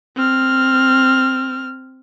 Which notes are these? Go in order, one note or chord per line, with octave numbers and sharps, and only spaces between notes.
C4 F6